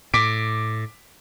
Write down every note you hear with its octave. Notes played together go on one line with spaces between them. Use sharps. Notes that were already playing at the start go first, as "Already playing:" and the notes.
A2 D6 B6 D7